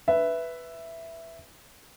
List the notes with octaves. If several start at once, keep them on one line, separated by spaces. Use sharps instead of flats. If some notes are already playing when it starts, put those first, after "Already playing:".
B4 E5